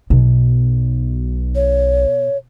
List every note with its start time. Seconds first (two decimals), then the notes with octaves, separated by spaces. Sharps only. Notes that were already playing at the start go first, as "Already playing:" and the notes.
0.10 B1 B2
1.55 C#5